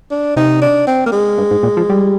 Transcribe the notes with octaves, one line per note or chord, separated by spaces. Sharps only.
D4
C3 D#4
D4
C4
A#3
G#3
G2
G#2
A#2
F3
G3